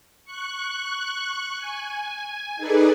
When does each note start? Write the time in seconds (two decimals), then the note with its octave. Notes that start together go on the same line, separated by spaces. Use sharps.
0.24 C#6 F#6
1.57 G#5
2.57 D#4 G#4 A4 B4 D5